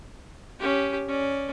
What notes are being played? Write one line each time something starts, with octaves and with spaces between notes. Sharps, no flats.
C#4 G4
C#4 D5